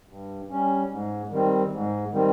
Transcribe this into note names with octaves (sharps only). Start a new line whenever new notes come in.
G2
G3 C#4
G#2
D#3 G3 C4
G#2
D#3 G3 C4